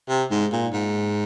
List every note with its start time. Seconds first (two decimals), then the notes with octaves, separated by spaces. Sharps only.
0.09 C3
0.31 G#2
0.52 A#2
0.73 G#2